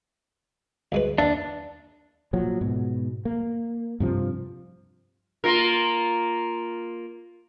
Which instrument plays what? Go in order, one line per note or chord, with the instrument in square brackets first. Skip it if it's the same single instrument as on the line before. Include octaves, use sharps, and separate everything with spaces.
[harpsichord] D2 G#3 B4
[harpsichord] D#2 E5 [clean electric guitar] D4
[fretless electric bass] A#2 F3 F#3
G#2 B2
A#3
G2 C3 F3
[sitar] A#3 F4 A#4